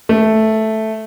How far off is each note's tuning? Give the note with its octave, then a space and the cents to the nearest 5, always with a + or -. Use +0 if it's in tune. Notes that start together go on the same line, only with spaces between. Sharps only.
A3 -5